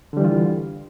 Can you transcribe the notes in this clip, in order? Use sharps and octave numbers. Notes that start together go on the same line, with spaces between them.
D3 E3 G3 F4